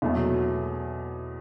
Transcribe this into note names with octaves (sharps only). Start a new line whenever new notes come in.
E2 B2 F#3 A3